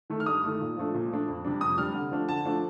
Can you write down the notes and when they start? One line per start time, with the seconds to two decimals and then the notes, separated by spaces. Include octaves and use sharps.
0.10 D#3 A3
0.20 F6
0.26 G2 D#6
0.44 D#3 A3
0.61 A#2
0.77 F3 A3 D4
0.94 A#2
1.11 F3 A3 D4
1.28 F2
1.44 C3 G3 D4
1.61 F2 D#6
1.78 C3 G3 D4 F6
1.94 D3
2.11 F3 A3 D4
2.28 D3 A5
2.45 F3 A3 D4